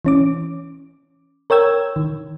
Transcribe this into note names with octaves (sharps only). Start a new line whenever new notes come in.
E3 C#4 D6
A#4 C#5 G5 E6 G#6
D#3